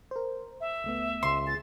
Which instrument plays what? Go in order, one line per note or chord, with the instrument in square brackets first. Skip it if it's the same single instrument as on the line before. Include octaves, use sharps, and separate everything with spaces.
[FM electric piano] A#4 C5
[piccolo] E5
[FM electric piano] C#2 A3 B3
[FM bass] C#2 [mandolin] C6
[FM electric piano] G#4 [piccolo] A6